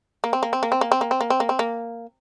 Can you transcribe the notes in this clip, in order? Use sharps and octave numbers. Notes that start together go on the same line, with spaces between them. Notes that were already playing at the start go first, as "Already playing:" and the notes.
A#3
C4
A#3
C4
A#3
C4
A#3
C4
A#3
C4
A#3
C4
A#3
C4
A#3